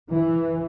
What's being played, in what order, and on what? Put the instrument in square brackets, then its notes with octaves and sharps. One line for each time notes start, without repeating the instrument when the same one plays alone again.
[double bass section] E3